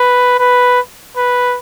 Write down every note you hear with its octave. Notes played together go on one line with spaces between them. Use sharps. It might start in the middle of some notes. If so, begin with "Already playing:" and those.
Already playing: B4
B4
B4